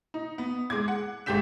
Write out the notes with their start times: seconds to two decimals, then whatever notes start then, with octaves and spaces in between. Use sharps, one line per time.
0.14 D#4
0.38 B3
0.70 G#3 D6 G#6
0.88 F#5
1.26 G#1 G#3 G4 G6 B6 E7